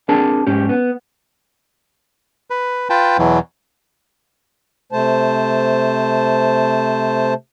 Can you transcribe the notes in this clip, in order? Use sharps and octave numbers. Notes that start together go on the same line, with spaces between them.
C4 D4 G#4 A#4 A5
G#2 C#4 G4
B3
B4
F4 B4 G5 A5
E2 B2 E3 F#3
C3 A3 C5 A5